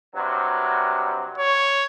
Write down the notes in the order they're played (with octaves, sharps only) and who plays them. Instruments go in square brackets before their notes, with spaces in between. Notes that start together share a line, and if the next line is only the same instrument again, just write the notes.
[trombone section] G2 C3 F#3
[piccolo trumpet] C#5